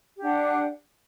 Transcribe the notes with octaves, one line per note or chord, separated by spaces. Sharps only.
D4 G4 F#5